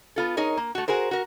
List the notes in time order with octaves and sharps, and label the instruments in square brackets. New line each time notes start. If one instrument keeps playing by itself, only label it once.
[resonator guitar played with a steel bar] B3 F4 A4
D#4 G#4 A#4 C#5
A#3
A3 F#4
F#4 G#4 A#4 C5
F#4 A#4